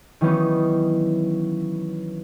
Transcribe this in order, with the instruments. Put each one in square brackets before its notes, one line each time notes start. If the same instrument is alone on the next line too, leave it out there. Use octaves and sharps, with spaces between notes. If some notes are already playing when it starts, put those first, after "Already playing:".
[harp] D#3 E3 F#3 B3 C#4 D#4